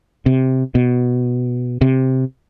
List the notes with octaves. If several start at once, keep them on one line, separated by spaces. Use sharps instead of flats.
C3
B2
C3